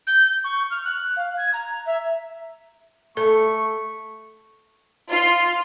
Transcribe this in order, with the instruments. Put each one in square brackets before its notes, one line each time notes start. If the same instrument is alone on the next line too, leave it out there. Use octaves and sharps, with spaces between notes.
[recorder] G6
C#6
F6
F#6
F5
G#6
A#5
E5
[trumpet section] A3 C#6 [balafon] A4
[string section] F4